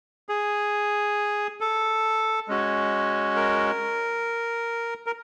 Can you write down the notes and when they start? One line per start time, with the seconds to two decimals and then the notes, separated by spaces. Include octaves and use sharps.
0.29 G#4
1.61 A4
2.48 G#3 C#4 F#4
3.36 A#4
5.06 A#4